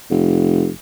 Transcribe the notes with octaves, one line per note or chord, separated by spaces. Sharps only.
F1